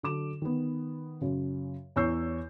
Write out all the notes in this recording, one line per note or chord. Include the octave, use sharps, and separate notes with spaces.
D3 F#3 D6 E7
D#3 B3
F#2 C#3
E2 C#5 C#6 E6 G6 C7